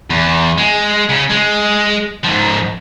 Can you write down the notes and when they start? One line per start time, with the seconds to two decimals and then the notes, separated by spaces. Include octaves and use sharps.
0.10 E2
0.58 G#3
1.10 C#3 C#4
1.31 G#3
2.24 G#2 F3